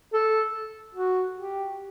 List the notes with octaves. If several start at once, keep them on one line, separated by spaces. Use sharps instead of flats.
A4
F#4
G4